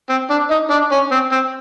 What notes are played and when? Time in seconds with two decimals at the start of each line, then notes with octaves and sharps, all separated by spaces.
0.10 C4
0.30 D4
0.50 D#4
0.70 D4
0.92 C#4
1.11 C4
1.32 C4